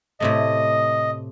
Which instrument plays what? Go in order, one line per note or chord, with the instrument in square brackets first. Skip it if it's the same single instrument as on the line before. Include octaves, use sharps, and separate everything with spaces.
[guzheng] A2 C3 A3 [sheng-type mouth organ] D#5